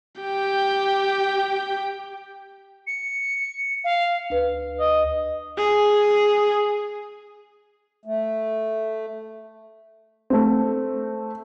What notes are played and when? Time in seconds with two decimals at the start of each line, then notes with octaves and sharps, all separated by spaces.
0.22 G4 G5
2.87 C#7
3.84 F5
4.30 D2 B4
4.80 D#5
5.57 G#4
8.05 A3
10.30 A3 C4